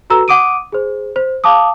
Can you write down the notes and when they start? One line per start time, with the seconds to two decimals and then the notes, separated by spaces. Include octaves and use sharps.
0.10 F#4 A4 B4 A#5 E6
0.28 F#5 D6 D#6 D7 D#7
0.72 G#4 C5
1.16 C5
1.44 F5 A5 D6 D#6